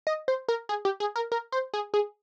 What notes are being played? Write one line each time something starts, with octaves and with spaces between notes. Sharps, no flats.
D#5
C5
A#4
G#4
G4
G#4
A#4
A#4
C5
G#4
G#4